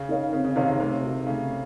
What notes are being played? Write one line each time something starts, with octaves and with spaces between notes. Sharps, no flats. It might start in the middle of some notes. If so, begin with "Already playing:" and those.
Already playing: C#3
D#4 A#4 C#5 F5
C#3 C4
C#3
C3 D#3 D#4 A#4 C#5 F5
C#3
C3 A3
D#4 F#4
C#3 A3